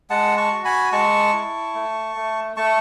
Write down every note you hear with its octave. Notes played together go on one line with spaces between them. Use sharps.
G#3 F#5 A5
A5 C#6
F#4
G#5 B5
G#3 A5 C#6
E4
A3
A3
A3 A5 C#6